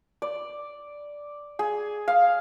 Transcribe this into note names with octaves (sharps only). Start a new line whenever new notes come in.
D5
G#4
F5